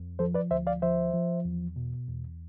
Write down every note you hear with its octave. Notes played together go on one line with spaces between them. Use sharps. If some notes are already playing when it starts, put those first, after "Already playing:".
Already playing: F2
F3 A4 C5
B4 D5
D2 C5 E5
D5 F5
F3 C5 E5
F3
E2
B2
E2